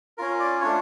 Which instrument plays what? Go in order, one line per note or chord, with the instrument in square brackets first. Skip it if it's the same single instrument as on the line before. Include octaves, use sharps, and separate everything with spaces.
[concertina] C#4 F4 A#4
D5
A3 D4 F4 C#5